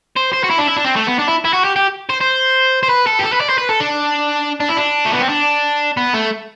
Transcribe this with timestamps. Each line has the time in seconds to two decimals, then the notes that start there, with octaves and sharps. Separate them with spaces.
0.17 C5
0.33 C5
0.44 F#4
0.50 E4
0.59 D4
0.68 E4
0.77 D4
0.85 C4
0.96 A3
1.07 B3
1.19 D4
1.28 E4
1.45 E4
1.53 F#4
1.64 G4
1.76 G4
2.10 C5
2.21 C5
2.83 C5
2.89 B4
3.07 A4
3.19 G4
3.23 A4
3.32 B4
3.40 D5
3.49 C5
3.58 B4
3.69 A4
3.80 D4
4.60 D4
4.69 E4
4.77 D4
5.05 A3
5.13 B3
5.21 C4
5.29 D4
5.97 B3
6.14 A3